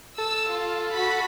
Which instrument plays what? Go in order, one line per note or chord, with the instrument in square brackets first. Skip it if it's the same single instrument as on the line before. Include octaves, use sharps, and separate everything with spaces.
[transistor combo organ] A4 [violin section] E6
[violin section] F4
F#4 B5